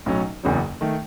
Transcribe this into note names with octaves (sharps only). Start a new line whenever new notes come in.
B1 A2 F#3 C#4
F#1 E2 C#3 F#3
D#3 A3